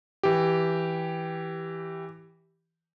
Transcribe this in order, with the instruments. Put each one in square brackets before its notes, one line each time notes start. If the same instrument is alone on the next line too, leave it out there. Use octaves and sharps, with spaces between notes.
[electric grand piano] E3 G4